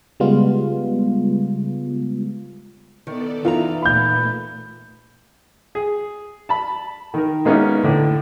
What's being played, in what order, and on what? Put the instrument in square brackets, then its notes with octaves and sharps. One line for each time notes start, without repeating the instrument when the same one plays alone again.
[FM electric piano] C#3 G3 G#3 B3 F4
[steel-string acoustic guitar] D#3 [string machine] B3 A4 D5
[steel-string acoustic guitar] E3 D#4 A#5 [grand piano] F4
[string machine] A#2 A3 [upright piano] B5 G6
[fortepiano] G#4
A5 B5
D#3 A#4
G#3 A#3 B3 C#4 D#4 E4
A2 D3